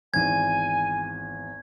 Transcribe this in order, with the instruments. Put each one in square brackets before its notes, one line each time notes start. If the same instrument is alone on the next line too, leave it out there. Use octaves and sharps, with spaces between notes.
[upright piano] G#1 E2 [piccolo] G#5 [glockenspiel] G#6